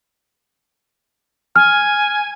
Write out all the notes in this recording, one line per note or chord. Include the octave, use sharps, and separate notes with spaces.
G#5 F6